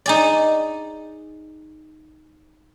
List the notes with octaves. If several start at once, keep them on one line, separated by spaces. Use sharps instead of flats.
D#4 G#4 D5